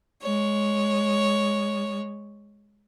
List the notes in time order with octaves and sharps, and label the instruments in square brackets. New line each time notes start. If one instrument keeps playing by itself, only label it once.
[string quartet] G#3 C#5